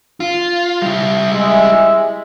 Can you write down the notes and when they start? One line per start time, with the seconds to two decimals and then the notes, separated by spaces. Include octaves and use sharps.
0.20 F4
0.82 G3 E4
1.30 G#3 E5